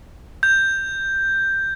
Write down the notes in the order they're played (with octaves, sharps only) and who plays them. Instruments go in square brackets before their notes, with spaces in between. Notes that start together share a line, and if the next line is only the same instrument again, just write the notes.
[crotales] G6